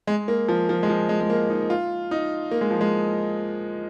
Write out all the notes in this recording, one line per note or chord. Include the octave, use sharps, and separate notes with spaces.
G#3
A#3
F3
F3
G#3
F3
G#3
G#3
A#3
D#4
F4
D#4
A#3
G#3
F3
G#3